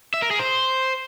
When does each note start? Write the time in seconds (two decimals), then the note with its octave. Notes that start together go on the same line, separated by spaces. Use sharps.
0.14 E5
0.22 A#4
0.31 G#4
0.39 C5